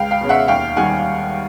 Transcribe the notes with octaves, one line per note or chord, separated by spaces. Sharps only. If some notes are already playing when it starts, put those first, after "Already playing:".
Already playing: C#2 F5 G5
F5 G5
B2 G#3 C#4
E5 F#5
D#2 F5 G5
D#3 G3 F#5 G#5